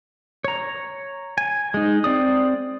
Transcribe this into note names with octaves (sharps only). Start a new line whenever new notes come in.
C#5 A#5
G#5
G#3 D#4
C4 D5 D#6